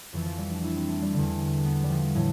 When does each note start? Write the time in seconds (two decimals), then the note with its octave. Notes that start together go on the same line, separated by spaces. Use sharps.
0.13 F2 E3 F3
0.26 F3
0.38 G3
0.51 D4
0.64 E4
0.76 C4
0.89 A3
1.02 G3
1.13 E2 D3
1.65 B3
1.83 G3
1.89 F3
2.15 A2 E3